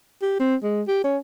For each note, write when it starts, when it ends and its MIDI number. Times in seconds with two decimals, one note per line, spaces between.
0.22 0.37 67
0.40 0.56 60
0.63 0.82 56
0.88 1.02 67
1.04 1.17 61